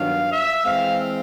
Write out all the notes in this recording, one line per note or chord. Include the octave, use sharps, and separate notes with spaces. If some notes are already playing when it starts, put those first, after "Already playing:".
Already playing: G2 D#3 F#3 B3 D4 F5
E5
E3 G#3 C4 F5